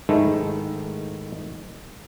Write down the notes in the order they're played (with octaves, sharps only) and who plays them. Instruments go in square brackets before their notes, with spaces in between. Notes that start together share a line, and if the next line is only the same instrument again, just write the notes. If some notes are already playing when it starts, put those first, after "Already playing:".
[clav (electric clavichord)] G#2 D#3 G#3 A3 E4